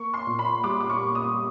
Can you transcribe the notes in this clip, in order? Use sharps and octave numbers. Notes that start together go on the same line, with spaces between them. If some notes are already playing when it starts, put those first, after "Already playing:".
Already playing: A#3 C#6
C6
A#2
B5
G3 D6
D6
C#6
A#3
D#6